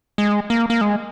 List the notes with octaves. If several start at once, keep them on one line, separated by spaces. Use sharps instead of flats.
G#3
A#3
A#3
G#3